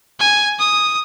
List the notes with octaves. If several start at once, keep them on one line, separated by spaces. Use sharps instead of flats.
G#5
D#6